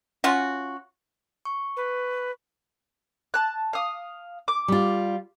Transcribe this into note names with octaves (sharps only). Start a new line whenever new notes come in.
C#4 F4 F#4
C#6
B4
A5 F#6
F5 D#6
D6
G3 F4